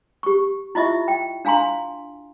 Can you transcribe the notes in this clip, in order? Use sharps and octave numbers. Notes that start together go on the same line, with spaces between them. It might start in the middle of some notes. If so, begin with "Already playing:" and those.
G4 C#6
E4 F4 D#5 E5 C#6
G5
D4 F5 G#5 A#5 C6